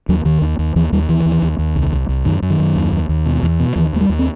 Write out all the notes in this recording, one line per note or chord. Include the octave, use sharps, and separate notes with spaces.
D#2 F#3
D#2 D#3
D#2
D#2
D#2 E3
D#2 G3
D#2 E3
D#2
D#2
D#2
C2
C2
C2
F#2 D#3
F#2
D#3
F#2
D#2
D#2
D#2
B2
E2
B2
D#2 E3
D#2 A3
G3
D#2
C4